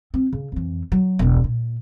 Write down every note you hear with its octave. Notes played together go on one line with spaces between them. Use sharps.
C4
C#3
F2 E3
F#3
E1 C#2
A#2